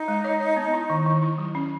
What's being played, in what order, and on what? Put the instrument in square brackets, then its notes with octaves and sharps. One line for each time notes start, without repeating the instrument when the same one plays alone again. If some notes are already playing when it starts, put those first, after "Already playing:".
Already playing: [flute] D#4
[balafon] G#3
C#5
C#5
B3
E4
D#3
D#3
E4
F#3
C#4